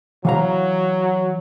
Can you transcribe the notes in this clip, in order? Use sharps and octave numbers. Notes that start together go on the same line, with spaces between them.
E3 F#3 F5 A#5